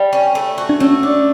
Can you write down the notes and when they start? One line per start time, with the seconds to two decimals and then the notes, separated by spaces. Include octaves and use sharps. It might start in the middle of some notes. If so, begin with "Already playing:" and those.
Already playing: G3
0.13 C#4
0.35 A3
0.58 F#4
0.69 D4
0.80 A3 C#4
1.03 D4